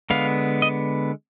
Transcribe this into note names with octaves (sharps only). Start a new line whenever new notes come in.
D3 G#3 B3 F5
D#5